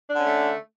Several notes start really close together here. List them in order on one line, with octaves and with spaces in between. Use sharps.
D4 D3 C#4 A3